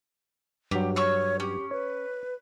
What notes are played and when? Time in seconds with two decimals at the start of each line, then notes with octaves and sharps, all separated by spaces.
0.71 G2 F#3 G4
0.96 C#5 C#6 E6 F6
1.40 C#4 G4
1.71 B4 C#5